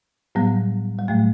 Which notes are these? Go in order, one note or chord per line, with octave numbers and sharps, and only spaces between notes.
A2 F#3 G3 B3
G3
A2 F#3 A3